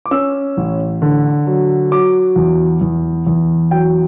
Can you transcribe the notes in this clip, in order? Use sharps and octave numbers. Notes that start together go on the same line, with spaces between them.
D6
C#4 E6
A1
D3
F#3
F#3 D6
E2
E2
E2
F#3 G5